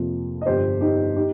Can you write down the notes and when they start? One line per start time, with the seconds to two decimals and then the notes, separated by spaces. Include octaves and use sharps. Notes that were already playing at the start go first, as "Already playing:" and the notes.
Already playing: F2 C3 F3 A#3
0.41 D#5
0.46 G1 G2 F3 G4 C5
0.81 D#4 G4
1.16 D#4 G4